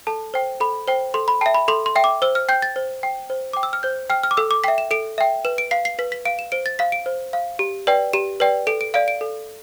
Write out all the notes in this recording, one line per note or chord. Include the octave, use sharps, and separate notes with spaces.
A4 A5
C5 G5
A4 B5
C5 G5
A4 C6
B5
E5 G5 A5
B5
A4 C6
C6
E5 G5
D6
C5 E6
F6
G5 G6
A6
C5
G5
C5
G5 D6
E6
F6
C5 G6
G5 F6
F6
D6
A4 E6
D6
E5 G5 B6
E7
A4 D7
E5 G5
B4 E7
D7
F5 C7
C7
B4 B6
B6
F5 D7
E7
C5 D7
A6
F5 B6
D7
C5
F5
G4
B4 D5 G5
G4 E7
B4 D5 G5
A4 D7
D7
D5 F5 D7
D7
A4